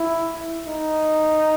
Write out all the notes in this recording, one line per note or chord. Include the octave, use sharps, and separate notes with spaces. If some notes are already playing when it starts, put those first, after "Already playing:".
Already playing: E4
D#4